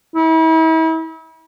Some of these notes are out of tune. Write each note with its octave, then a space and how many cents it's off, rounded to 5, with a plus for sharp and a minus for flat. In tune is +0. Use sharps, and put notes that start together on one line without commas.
E4 -40